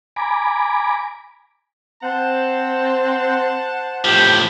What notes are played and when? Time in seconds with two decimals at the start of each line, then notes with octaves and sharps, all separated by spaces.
0.16 G#5 A#5 B5 D6
2.03 C4 C5 F#5 A5
4.05 A2 F3 G4